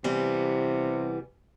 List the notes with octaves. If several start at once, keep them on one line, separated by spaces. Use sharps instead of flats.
C3 E3 G3 B3